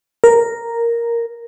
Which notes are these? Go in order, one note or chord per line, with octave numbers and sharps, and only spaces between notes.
A#4